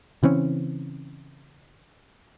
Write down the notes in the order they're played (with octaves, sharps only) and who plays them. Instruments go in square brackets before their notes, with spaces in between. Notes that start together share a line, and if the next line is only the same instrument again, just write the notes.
[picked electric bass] C#3 E3 C4 C#4